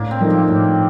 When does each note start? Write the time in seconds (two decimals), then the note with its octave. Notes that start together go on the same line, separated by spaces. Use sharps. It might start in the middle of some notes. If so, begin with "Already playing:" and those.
Already playing: A2 A#3 D4
0.11 C4
0.21 F3 A3 D#4 A#4
0.30 G4
0.49 A2